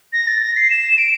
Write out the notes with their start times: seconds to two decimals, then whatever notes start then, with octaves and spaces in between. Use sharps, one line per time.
0.13 A#6
0.27 A6
0.42 A#6
0.57 C7
0.70 E7
0.98 D7